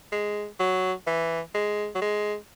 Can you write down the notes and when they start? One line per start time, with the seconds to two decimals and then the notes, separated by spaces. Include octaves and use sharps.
0.12 G#3
0.60 F#3
1.07 E3
1.54 G#3
1.95 F#3
2.02 G#3